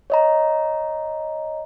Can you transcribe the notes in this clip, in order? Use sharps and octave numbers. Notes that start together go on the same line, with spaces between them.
C#5 D#5 A#5